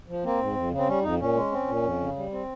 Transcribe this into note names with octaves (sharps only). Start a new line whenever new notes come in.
F3
A#3 C4
G#2
F2
C#3
C4
G3 C#4
F2 D#4
A#2 C#4
G#3
C4
A#2
F2
C#3
G3
C4